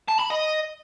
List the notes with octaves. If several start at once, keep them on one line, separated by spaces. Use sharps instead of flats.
A5
B5
D#5